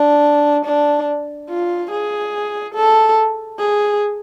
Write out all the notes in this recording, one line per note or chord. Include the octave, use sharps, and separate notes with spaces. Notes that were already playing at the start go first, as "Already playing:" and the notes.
Already playing: D4
D4
F4
G#4
A4
G#4